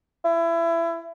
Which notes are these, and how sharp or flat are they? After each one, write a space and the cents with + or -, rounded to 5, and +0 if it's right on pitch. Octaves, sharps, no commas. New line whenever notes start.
E4 +25